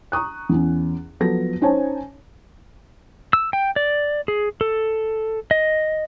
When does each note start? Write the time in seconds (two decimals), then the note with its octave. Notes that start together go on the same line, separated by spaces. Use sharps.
0.12 A#5 C#6 D#6 F#6
0.49 E2 C#4
1.20 F3 F#3 B3 A4 A#6
1.61 C#4 D#4 C5 C#5 G#5 A5
3.33 E6
3.53 G5
3.76 D5
4.28 G#4
4.61 A4
5.51 D#5